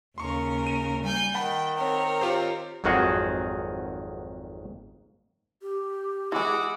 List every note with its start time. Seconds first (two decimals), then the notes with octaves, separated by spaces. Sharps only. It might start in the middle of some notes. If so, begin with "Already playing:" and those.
0.18 D#2 C#3 A#4 C6 C#6
0.67 D#7
1.02 G3 G#5 G6
1.34 D#3 F#5 G5 A5 B5
1.77 C4 A#4 C#5
2.21 F4 G4 C5
2.84 G#1 F2 D#3 F#3 F#4 G#4
5.62 G4
6.32 E3 G#3 E4 F#4 G#4 D6